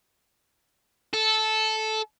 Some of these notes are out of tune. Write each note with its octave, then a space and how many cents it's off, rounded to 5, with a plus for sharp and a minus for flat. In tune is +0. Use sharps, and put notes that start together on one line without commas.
A4 -10